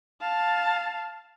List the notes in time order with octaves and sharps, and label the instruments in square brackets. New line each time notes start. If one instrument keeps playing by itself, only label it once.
[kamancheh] F5 A5